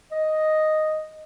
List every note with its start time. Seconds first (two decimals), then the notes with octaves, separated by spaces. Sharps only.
0.11 D#5